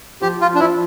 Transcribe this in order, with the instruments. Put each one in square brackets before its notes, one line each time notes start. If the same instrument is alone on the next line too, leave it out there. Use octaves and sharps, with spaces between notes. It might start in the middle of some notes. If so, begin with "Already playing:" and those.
[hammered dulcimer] F3 [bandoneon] G4
[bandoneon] F4
D4
[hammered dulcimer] F3 [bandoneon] E4